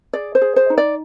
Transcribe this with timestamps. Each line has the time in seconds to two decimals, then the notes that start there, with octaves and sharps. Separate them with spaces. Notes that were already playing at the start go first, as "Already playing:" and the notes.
0.13 G#4 D5
0.35 C5
0.41 G#4
0.56 C5
0.70 D#4
0.78 D5